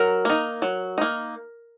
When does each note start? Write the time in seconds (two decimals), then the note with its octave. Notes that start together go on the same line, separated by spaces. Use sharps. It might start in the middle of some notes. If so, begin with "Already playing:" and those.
Already playing: F#3 A#4
0.25 A#3 D#4
0.62 F#3
0.98 A#3 D#4